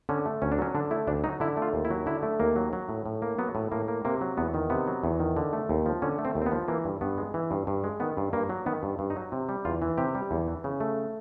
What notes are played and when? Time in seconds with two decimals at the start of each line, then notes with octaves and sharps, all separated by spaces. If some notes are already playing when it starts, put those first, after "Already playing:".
0.09 D3 C#4
0.26 A3
0.42 D2 C#4
0.52 D4
0.58 F#3 C#4
0.75 D3 D4
0.91 A3 E4
1.07 D2 D4
1.24 F#3 D#4
1.40 D3 E4
1.57 A3
1.62 F4
1.74 D#2
1.85 E4
1.90 F#3
2.06 D3 E4
2.23 A3
2.40 D#2 A#3
2.56 F#3
2.73 F#3
2.89 A2
3.06 A2
3.22 A#3
3.39 F#3 B3
3.55 A2
3.72 A2 A#3
3.88 A#3
4.05 C3 A#3
4.21 F#3
4.37 E2 B3
4.54 D#3
4.70 C3 B3
4.87 F#3
5.03 E2
5.20 D#3
5.37 D3
5.53 A3
5.69 D#2
5.86 F3
6.02 D3 C#4
6.18 A3
6.25 C4
6.35 D#2
6.42 C4
6.46 B3
6.52 F3
6.68 E3 A#3
6.85 G2
7.01 G2 B3
7.18 G#3
7.34 E3
7.51 G2
7.67 G2
7.84 G#3
8.00 D#3 B3
8.17 G2
8.33 G2 A#3
8.49 F#3
8.66 D#3 B3
8.83 G2
8.99 G2
9.10 D#4
9.16 F#3
9.32 C3
9.49 G3
9.65 E2 F4
9.82 E3
9.98 C3 G4
10.15 G3
10.31 E2
10.48 E3
10.64 C#3
10.80 A3